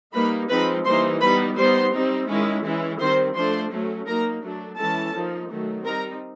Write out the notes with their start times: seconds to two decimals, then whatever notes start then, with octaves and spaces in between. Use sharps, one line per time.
0.13 G3 A#3 D#4 B4 B5
0.49 F3 G#3 C4 D#4 B4 B5
0.85 E3 G3 A#3 D#4 C5 C6
1.20 G3 B3 D#4 B4 B5
1.56 G3 B3 D#4 C5 C6
1.92 G3 C4 D#4
2.28 D#3 G#3 C#4 E4
2.64 E3 G#3 C#4 E4
2.99 D#3 G3 C4 C5 C6
3.35 F3 A3 D4 C5 C6
3.70 F#3 A3 C#4
4.06 F#3 A#3 D#4 A#4 A#5
4.42 F#3 A3 D4
4.78 E3 G#3 C#4 E4 A4 A5
5.14 F3 A#3 D#4
5.50 D#3 F#3 A3
5.85 G3 C4 D#4 A#4 A#5